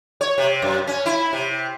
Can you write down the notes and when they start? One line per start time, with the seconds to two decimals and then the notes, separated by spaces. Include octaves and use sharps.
0.21 C#5
0.38 C3
0.62 F#2
0.87 C#4
1.06 E4
1.33 C3